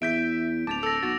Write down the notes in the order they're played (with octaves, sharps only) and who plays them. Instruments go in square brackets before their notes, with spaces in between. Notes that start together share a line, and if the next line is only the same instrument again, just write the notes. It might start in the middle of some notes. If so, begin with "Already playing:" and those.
[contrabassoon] E2 [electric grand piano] E5 G6 B6 [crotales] D7
[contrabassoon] D1 [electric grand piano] A5 [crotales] D6 A6 F7
[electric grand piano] A4 [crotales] E6 A#6
[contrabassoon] B1 [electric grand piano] F#4 [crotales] A6 A#6 F7